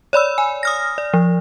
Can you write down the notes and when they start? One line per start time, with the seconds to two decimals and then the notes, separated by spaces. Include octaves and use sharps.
0.13 C#5 D5 B5 E6
0.38 G#5
0.63 D#6 F6 A#6
0.98 D5
1.14 F3